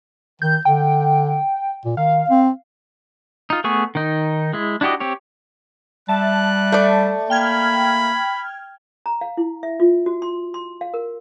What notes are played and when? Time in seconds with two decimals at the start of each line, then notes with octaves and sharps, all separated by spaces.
0.42 D#3 G6
0.65 D3 G5
1.85 A#2
1.97 D#3 F5
2.30 C4
3.50 D#4 F4
3.64 A3 B3 G#4 C#6
3.95 D#3 D#4
4.53 G#3 E4
4.81 D4 E4 F#4 G4 D#5
5.00 C4 G4 C#5
6.08 G3 E5 A5 F#6
6.72 A3 D5
7.30 A#3 G5 B5 F6 G#6
9.06 A#5
9.21 F5
9.37 E4
9.63 E5
9.80 F4
10.06 F#4
10.22 C6
10.54 C6
10.81 F5
10.94 A#4